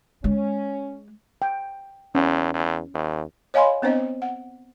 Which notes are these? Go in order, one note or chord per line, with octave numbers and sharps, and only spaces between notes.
G#3 C#4
G5
E2 C#4
E2
D#2
C#5 D#5 F5 G#5 B5 C6
B3 C4 D4 C5 D#5
F#5